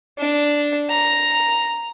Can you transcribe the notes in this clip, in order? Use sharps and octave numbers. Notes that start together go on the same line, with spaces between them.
D4
A#5